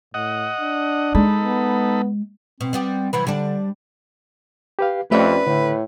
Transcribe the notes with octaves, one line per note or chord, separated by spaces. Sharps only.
A2 D#5 F#5
D4
G#3 D#4 A4 B5
B3
B2 C4
G3 B3 G4
C3 E3 F#3 B4
D3 G3 D4
G4 B4 F5
F2 A3 C#4 G4 B4 D5 E5
A2 D3